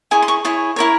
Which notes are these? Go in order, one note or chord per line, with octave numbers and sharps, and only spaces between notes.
E4 G#4 C#5 G#5
C6
C#6
E4 G#4 C#5
E4 A#4 C#5